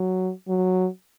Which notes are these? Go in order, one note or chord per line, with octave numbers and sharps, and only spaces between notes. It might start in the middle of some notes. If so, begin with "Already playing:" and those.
Already playing: F#3
F#3